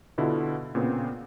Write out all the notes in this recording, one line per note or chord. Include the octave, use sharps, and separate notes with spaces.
B2 D3 E4 F4
A#2 C#3 B3 C4